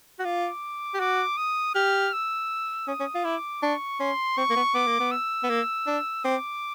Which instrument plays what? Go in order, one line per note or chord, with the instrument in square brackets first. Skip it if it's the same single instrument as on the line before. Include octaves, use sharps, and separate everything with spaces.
[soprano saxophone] F#4
[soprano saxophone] F4 [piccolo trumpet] D6
[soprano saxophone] G4
[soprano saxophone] F#4 [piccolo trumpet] D6
[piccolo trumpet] D#6
[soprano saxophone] G4 [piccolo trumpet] F6
[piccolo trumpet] E6
[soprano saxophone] C#4 [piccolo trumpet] D#6
[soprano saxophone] C#4
F4
[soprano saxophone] E4 [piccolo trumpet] D6
[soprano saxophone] D4 [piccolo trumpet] C#6
[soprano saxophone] C#4 [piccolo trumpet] C6
[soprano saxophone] C4 [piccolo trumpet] C#6
[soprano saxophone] A#3
B3
[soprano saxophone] B3 [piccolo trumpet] D6
[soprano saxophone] A#3
B3
[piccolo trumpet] E6
[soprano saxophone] B3
A#3
D4
[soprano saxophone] C4 [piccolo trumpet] D6